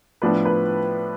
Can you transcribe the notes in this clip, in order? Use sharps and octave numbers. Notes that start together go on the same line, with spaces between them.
A2 F3 B3 D4 B4
B4